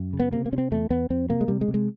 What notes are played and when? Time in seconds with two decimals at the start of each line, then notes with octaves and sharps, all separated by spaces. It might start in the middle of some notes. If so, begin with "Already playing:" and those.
Already playing: F#2
0.13 C#3
0.20 B3
0.32 C3 A#3
0.46 A#3
0.52 C3 C#4
0.58 C4
0.71 E2 A3
0.90 E2 B3
1.10 F2 C4
1.29 C3 A#3
1.41 G#3
1.48 C3 G3
1.61 G#3
1.68 C3
1.74 G#3